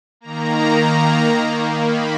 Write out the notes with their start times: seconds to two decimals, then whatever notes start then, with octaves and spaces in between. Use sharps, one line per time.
0.21 D#3 A#3 A#5
1.29 D#3 A#3
1.82 B5